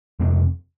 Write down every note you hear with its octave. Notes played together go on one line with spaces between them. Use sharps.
F2 C3 G#3 C4